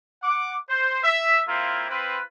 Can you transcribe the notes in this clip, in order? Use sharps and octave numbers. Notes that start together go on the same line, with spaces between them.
F#5 D6
C5
E5
A#3 C4 E4 F4
C4 F4 B4